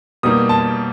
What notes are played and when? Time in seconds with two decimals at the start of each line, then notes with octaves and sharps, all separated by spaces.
0.23 B2 G3 A#3 D#4 D#6
0.49 A5